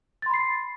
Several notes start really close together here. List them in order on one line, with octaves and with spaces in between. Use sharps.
A6 C6 B5 C7